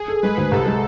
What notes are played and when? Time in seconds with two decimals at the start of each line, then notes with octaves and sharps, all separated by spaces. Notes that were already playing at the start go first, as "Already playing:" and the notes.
Already playing: G#4
0.08 A4
0.22 G#3 B4
0.37 D2
0.51 C2 A4
0.66 G#3